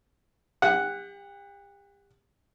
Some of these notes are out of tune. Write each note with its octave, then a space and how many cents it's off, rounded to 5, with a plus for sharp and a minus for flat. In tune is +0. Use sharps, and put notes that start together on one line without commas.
G4 +35 F#5 +0